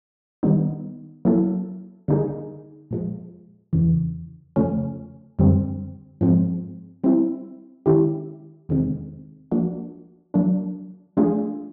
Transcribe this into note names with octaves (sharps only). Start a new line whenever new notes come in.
D#3 G3 B3 D#4
F#3 A#3 C#4 E4 A4
D3 G3 A#3 D#4 G#4
A#2 F3 G#3
E2 C#3 E3
F2 C#3 F3 A3 C#4
F#2 D3 G3 C4
G#2 F3 G#3 C4
G3 C4 E4
D#3 G#3 C#4 E4 G4
E2 C3 D#3 G#3 C4
F3 A#3 D4 F#4
F#3 A#3 D4
F3 A3 D4 F4 G#4